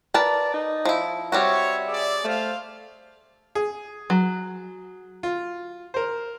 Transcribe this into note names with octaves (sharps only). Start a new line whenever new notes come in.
A#4 B4 D5 A5
D#4
F3 E4
G3 C4 F#4 C#5 E5
G#4 D5
A3 C5 F5
G#4
F#3
F4
A#4 C5